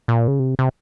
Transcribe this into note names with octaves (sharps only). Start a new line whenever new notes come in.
A#2
C#3
C3
C3